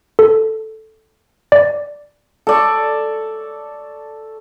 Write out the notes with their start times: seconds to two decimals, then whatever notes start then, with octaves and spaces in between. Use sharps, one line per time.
0.19 A4
1.52 D5
2.47 A4 D5 C#6